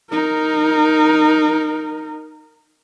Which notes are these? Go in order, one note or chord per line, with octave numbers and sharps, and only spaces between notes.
D#4 A#4